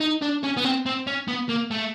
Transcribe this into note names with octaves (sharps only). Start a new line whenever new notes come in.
D#4
D4
C#4
B3
C4
C4
C#4
B3
A#3
A3